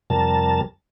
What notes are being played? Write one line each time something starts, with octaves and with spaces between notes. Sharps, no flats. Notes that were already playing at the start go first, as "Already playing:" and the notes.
F2 C3 G3 A#4 A5